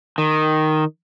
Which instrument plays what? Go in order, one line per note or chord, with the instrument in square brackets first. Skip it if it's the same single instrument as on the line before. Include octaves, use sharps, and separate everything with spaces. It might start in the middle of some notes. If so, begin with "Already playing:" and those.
[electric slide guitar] D#3